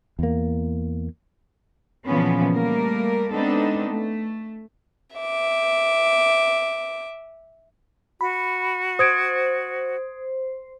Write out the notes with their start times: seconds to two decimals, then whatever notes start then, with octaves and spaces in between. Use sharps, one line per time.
0.19 E2 A#3
2.06 A#2 C#3 E3 F3 B3 C#4
2.53 G3 A3 A#3 A#4
3.32 G#3 B3 C4 D4 D#4 A4
3.88 A3
5.18 E5 D6
8.21 F#4 B5
8.99 C5 D#6 G#6 D7